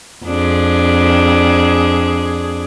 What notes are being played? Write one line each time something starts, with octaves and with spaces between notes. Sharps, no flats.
F2 D4 G#4